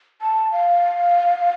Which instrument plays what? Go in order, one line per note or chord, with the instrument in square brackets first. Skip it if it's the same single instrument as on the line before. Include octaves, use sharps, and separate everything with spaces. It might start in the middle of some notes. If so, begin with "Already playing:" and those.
[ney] A5
F5